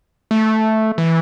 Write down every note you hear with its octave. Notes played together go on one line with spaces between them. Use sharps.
A3
E3